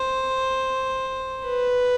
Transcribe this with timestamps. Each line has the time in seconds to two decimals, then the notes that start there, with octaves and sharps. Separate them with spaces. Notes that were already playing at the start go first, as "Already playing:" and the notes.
Already playing: C5
1.46 B4